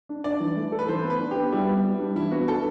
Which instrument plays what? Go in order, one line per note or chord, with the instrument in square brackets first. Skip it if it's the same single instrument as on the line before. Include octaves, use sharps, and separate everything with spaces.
[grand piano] D4
[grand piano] D4 [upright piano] D5
[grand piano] E3
A3
A4
[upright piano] B4
[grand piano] E3 [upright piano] C5
[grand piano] B3
[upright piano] B4
[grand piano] D4
[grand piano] B3 [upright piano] G4
[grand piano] G3 [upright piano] E4
[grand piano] B3
G3
D4
[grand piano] E3 [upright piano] E4
[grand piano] B3 [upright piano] F#4
[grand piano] D4 [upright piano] A4